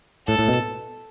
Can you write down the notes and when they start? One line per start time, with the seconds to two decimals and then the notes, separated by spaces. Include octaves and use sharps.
0.27 A2 A4
0.39 A2
0.48 B2